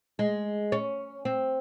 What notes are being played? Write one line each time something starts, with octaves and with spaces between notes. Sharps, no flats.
G#3
C#4
C4